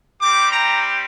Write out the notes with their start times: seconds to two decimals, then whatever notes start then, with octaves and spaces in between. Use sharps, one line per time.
0.21 G3 C4 G4 D6
0.52 A#5